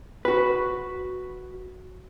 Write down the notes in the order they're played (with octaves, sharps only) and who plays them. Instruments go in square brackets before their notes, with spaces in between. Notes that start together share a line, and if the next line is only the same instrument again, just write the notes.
[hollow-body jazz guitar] F#4 B4